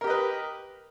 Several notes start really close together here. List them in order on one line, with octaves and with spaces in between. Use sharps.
A#4 G4 D#5 B4